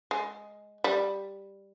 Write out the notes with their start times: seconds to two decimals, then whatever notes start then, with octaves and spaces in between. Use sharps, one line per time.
0.11 G#3
0.84 G3